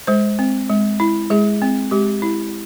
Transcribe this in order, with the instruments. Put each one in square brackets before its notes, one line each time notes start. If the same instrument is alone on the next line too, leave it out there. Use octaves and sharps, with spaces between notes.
[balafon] G#3 C5
C4
G#3
E4
G#3 G#4
C4
G#3 G4
E4